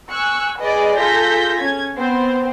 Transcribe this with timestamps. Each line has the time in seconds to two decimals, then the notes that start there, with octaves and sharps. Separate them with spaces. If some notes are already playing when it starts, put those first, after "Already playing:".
0.10 G#5 C#6 E6 F#6
0.60 G#4 B4 D5 D#5
0.97 F4 G#4 A4 G6 A#6 B6
1.59 C#4 G#6
1.96 B3 C4 C5